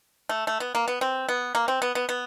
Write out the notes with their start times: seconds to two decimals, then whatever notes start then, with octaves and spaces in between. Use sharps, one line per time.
0.29 A3
0.47 A3
0.60 B3
0.75 A#3
0.88 B3
1.01 C4
1.29 B3
1.55 A#3
1.68 C4
1.82 B3
1.95 B3
2.09 B3